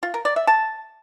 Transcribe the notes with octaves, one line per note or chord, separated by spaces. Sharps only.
F4
A#4
D5
E5
A5